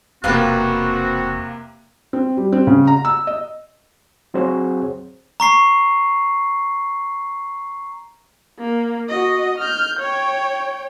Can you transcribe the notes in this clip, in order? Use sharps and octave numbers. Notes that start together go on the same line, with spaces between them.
E1 C3 A#3 C4 F4 F#4 B4 F5
C4
G3
C4
C#3
A#5
E6
D#5
F#3 C4 F#4 G#4 C5 C#5
A#5 C#6 C7
A#3
F#4 D#5
F6 G6
C#5 G5